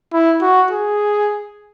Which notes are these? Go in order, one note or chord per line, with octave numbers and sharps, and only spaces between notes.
E4
F#4
G#4